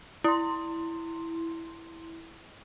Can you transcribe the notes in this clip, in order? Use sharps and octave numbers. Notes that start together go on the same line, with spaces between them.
E4 C6